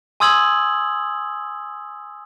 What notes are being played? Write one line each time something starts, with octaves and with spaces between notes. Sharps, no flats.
G#5 C6 D#6 E6 G#6 F#7